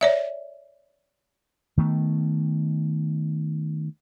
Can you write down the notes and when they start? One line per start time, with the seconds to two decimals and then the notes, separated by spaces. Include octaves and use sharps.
0.01 C#5 D5 E5
1.77 D#3 A3 B3